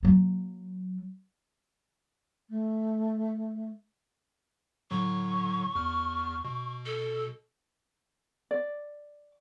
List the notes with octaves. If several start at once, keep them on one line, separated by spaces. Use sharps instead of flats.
F#3 A#3
A3
A2 D3 F#3 C#6
E2 F6
B2
A4
D5